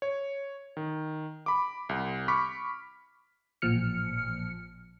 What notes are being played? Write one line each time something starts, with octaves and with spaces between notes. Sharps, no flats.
C#5
D#3
B5 D6
C2
B5 C#6 D6 F6 B6
A1 A#2 F3 F6 C#7